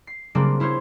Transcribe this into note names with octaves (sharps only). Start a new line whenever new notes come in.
C7
C#3 F#3 G3 A#3 C4 D4
E4 F4 C5 C#5